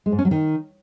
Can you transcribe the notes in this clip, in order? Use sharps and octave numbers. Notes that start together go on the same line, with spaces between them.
G#3
G#2
C#4
F#3
D#3